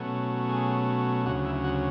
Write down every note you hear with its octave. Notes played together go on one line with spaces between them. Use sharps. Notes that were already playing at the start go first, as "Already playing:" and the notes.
Already playing: B2 F#3 A3 C#4
G#4
D2 C#3 F#3 F#4
E4
F#4